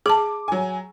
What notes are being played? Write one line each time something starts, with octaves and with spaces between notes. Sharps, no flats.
G#4 A5 D6
F#3 G#5